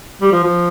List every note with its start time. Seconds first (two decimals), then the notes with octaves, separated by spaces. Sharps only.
0.21 G3
0.32 F3
0.43 F3